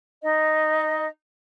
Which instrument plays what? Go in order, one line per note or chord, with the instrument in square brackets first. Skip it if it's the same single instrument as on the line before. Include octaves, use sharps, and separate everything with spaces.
[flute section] D#4 D#5